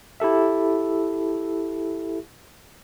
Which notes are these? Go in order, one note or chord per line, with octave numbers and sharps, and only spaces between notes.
E4 G4 A4 E5